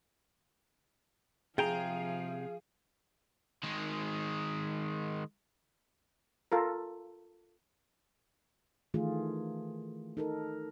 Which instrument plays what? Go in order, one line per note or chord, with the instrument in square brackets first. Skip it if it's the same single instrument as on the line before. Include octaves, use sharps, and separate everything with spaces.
[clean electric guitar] C3 G5 A#5 [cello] F3 [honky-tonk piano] G#4 [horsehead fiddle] F5
[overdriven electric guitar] D#3 G#3
[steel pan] F4 A4 A#4
[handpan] D#3 E3 A3 F4 G#4
D#4 A4 A#4